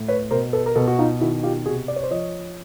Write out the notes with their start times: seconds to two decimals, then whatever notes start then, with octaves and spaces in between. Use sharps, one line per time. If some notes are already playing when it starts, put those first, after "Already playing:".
Already playing: A2
0.08 B4 C#5
0.31 B2 A#4 C5
0.53 A4 B4
0.66 A#4
0.76 B2 A4 B4
0.88 F#4
0.99 D#4 F4
1.21 D#3 E4 F#4
1.43 F4 G4
1.66 C3 F#4 G#4
1.88 D5
1.96 C#5
2.03 C5 D5
2.11 F3 C#5 D#5